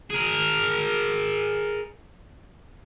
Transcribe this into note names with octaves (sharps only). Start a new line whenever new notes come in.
G#4 A#4